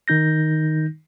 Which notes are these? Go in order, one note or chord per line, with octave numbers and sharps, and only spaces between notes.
D#3 D#4 G6 A#6